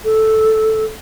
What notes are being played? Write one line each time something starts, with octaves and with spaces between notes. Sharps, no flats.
A4